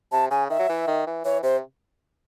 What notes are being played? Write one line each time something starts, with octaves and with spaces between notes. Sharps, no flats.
C3 A5
C#3 G#5
D#3 E5
F#3
E3
D#3
E3
E3 C#5
C3 C5